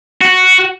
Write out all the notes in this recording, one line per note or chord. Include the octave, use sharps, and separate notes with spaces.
F#4